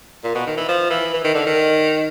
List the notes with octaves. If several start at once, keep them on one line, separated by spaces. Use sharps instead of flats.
A#2
B2
D#3
E3
F3
E3
E3
D#3
D3
D#3